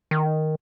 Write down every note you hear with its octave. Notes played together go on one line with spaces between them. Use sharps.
D#3